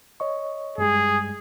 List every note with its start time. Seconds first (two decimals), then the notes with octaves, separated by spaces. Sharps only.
0.20 C#5 D#5 C#6
0.78 G2 G3 G#3 G#4